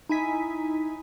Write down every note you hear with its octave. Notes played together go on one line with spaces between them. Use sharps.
D#4 E4 G#5 B6